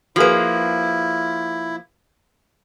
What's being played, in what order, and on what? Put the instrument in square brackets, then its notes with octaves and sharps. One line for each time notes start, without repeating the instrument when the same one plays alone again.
[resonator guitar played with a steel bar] F3 A#3 [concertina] E4 [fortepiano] F#4 G#4 B4